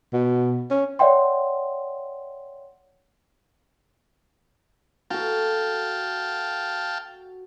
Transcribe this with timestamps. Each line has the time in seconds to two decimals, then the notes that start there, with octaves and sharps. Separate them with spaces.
0.13 B2
0.70 C#4
0.99 C#5 D5 E5 F#5 G5 C6
5.10 F#4 A4 F5 G5 A5